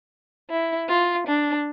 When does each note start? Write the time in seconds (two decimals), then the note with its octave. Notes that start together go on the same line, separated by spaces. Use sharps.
0.50 E4
0.89 F4
1.27 D4